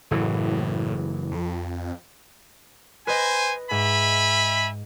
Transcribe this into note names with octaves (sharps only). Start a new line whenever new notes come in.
F#1 A2 E3
F2
B4 C5 D#5 G#5
G#2 E5 G#5 B5